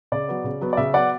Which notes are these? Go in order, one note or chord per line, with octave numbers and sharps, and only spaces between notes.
C#3 D5
F#3 B3
C#3
F#3 B3
D5
C#3 E5
F#3 B3 D5 F#5